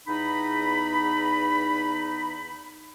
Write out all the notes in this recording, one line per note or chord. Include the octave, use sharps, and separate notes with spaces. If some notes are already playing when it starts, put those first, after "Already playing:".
E2 D#4 B5